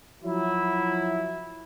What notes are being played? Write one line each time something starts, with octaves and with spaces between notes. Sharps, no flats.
F3 F#3 E4